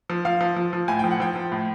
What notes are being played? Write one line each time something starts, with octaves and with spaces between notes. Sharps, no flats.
F3
F3 F5
F3
F3
F3
A2 G#5
F3 G5
F#5
F3 G5
F3
A2